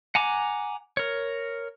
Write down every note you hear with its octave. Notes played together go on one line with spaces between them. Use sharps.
F#5 G#5 A#5 D6
A#4 C#5